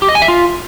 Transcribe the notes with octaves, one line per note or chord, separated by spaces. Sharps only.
G4
D#5
G#5
E5
F4